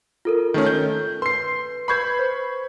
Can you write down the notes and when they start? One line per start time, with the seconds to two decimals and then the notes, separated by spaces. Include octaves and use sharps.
0.25 F4 A4 A#4
0.54 D#3 A3 C#4
0.66 G6
1.22 B4 C6 C7
1.88 B4 B5 C#6 G6 G#6 C7
2.19 C5